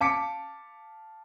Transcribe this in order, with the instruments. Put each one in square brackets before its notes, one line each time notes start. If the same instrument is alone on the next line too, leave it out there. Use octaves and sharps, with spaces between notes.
[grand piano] F5 A5 D6 B6 C#7 D7